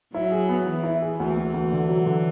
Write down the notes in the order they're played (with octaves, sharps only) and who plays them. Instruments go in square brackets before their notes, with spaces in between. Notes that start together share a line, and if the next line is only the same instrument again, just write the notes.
[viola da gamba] F#3 [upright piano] E4
[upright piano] G#4
B3
[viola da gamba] E3 [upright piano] E4
[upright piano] E4
G#4
[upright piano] D2 [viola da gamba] E3
[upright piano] D2
D2
D3
F#3
D3